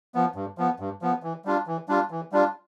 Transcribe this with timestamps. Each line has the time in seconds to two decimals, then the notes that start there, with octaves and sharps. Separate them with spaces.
0.15 F3 B3
0.35 G2
0.58 F3 B3
0.80 G2
1.02 F3 B3
1.23 E3
1.45 G3 D4 F4
1.67 E3
1.89 G3 D4 F4
2.11 E3
2.32 G3 D4 F4